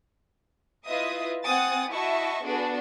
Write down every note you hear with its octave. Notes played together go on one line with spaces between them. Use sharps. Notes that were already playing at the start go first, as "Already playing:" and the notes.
E4 F4 B4 D#5 E5 D#6
C4 F#5 G#5 D#6 A6
E4 F#4 D#5 E5 A5 C#6
B3 D4 F#4 G#4 A4 B4